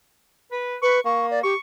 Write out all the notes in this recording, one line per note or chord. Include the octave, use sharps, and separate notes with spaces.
B4
B4 C#6
A#3 C#6
D5
G4 C#6